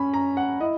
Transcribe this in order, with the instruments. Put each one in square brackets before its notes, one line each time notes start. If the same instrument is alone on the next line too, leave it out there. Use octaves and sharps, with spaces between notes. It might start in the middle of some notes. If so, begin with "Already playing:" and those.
Already playing: [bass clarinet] C#4 [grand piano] B5
[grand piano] A#5
F#5
[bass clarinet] E4 [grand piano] D#5